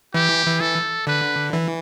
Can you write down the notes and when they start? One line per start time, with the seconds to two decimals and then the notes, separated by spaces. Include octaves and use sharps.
0.14 E3 G4
0.46 E3
0.60 A4
1.07 D3 B4
1.53 E3